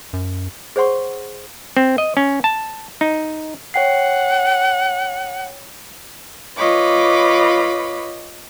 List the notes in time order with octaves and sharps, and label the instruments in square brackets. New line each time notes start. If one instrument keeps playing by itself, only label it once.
[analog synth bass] F#2
[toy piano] G#4 C5 C#5 F#5 C6 C#6
[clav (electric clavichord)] C4
D#5
C#4
A5
D#4
[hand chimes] C#5 G5 C7 [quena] F#5
[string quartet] F4 B4 C#5 D#5 B5 D6